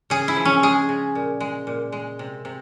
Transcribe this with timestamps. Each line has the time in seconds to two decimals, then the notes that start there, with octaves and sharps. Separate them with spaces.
0.10 C#3 G#4
0.28 E4
0.36 F3
0.45 C#4
0.63 G#3 G#4
0.89 C#3
1.15 A#2
1.40 G#3
1.67 A#2
1.92 G#3
2.19 C3
2.45 C3